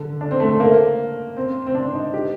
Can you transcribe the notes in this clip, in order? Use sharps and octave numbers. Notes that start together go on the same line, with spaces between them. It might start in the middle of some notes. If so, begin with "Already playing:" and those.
Already playing: D3
D4
C4
A3
A3
A#3
C4
C4
D4
D#4
G4